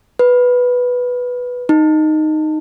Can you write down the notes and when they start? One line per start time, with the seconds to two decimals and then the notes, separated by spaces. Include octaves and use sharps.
0.19 B4
1.69 D#4